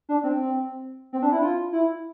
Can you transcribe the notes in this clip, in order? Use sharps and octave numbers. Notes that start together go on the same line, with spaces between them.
D4
C4
C4
D4
E4
F4
E4